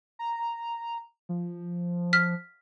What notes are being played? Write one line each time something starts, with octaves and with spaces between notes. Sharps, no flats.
A#5
F3
F6 B6